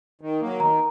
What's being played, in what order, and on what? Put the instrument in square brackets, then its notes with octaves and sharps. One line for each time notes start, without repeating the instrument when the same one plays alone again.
[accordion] D#3
F#3 A#3
[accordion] D#3 [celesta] A#5